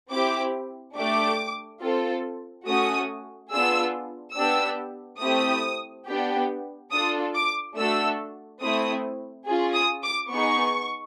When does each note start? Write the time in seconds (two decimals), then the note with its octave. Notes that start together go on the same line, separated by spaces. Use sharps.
0.11 C4 E4 G4 D6
0.96 A3 D4 G4 D6
1.81 C4 F4 A4
2.66 A3 C#4 F#4 D#6
3.51 B3 D4 F4 G#4 E6
4.36 B3 D4 G4 E6
5.21 A3 C4 E4 G4 D#6
6.06 B3 D4 G4
6.92 D4 F4 A4 D#6
7.34 D6
7.76 A3 D4 F#4 A4 E6
8.62 A3 C4 E4 D#6
9.46 C#4 F4 G#4
9.74 D#6
10.03 D6
10.31 B3 D#4 G#4 C#6